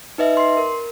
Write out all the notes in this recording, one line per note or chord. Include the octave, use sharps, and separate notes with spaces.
D#4 B4 D#5 E5
C6 C7
A#4